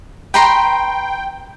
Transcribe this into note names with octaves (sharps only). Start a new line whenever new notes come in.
B4 G5 A#5 C6